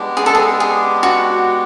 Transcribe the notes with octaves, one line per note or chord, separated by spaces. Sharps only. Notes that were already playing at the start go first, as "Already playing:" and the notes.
Already playing: G#3 B3 D4 G4
G#4
A4
G#4
G#4
F#4